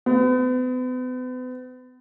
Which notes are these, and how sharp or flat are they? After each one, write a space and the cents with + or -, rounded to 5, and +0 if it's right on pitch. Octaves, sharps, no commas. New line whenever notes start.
B3 +40